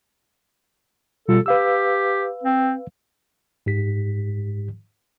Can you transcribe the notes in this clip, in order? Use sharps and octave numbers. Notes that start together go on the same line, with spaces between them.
B2 G3 F4 A4
G4 B4 F5 E6
C4
G#2 G4 B6